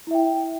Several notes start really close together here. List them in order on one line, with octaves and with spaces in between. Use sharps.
E4 E5 G5